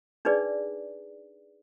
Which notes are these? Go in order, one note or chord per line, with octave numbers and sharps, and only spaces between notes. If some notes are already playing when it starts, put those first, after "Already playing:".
D4 D#4 G#4 B4 D5